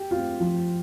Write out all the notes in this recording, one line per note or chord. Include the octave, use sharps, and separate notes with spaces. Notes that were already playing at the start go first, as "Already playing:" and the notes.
Already playing: G4
C4 F4
F3